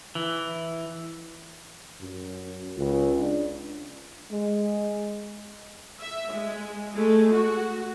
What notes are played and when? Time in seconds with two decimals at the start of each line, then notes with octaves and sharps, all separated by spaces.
0.15 E3
2.01 F#2
2.77 C#2
3.19 D4
4.31 G#3
6.01 E5
6.32 G#3
6.94 G#3 A3
7.32 F#4